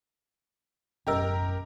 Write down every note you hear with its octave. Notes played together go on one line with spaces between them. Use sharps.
F#1 B1 F#2 C#4 G4 A#4 D#5 E6